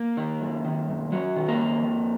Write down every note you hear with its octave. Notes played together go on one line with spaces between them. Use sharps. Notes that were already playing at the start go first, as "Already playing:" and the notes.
Already playing: A#3
D#3
F#2
D#3
F#2
F#2 F#3
D#3
A#3
F#2
F2